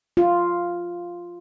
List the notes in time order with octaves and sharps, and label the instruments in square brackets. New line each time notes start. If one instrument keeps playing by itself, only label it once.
[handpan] F4